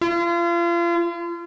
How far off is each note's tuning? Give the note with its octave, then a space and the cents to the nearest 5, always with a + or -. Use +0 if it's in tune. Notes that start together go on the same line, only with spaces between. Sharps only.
F4 -35